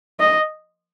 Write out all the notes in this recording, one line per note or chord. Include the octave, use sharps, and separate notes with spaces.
D#5